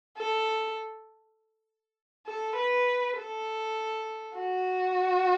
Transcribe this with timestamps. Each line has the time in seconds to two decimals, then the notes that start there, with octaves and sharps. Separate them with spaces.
0.17 A4
2.27 A4
2.57 B4
3.18 A4
4.38 F#4